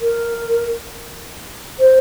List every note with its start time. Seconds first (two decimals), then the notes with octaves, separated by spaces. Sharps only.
0.01 A#4
1.80 C5